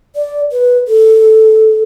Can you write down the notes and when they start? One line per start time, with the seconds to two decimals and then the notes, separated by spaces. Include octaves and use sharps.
0.16 D5
0.52 B4
0.88 A4